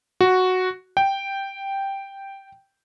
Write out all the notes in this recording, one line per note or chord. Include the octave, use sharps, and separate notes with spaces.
F#4
G5